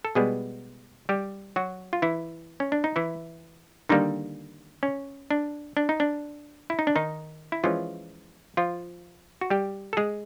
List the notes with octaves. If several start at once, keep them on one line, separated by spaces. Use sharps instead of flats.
A4
B2 G3 G#3 B3 G#4
G3 G4
F#3 F#4
F4
E3 E4
C#4
D4
D#4
E3 E4
D3 D#3 G3 A#3 D#4
C#4
D4
D4
D#4
D4
E4
D#4
D4
D#3 D#4
E4
E3 F3 G#3 C#4 F4
F3 F4
F#4
G3 G4
A4
G#3 G#4